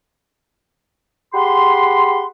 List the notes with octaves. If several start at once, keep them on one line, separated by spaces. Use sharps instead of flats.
G4 G#4 F#5 B5 C6